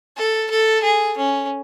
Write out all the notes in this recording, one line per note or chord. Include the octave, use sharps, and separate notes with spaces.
A4
A4
G#4
C#4